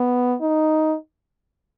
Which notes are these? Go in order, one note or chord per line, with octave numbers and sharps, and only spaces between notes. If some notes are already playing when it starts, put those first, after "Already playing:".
Already playing: B3
D#4